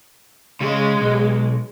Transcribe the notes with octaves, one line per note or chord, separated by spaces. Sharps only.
C#3 G#3 C#4
B1